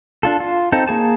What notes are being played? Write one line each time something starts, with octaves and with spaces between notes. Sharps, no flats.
D4 F4 A4
F4
C4 D#4 A4
A#3 G#4 A5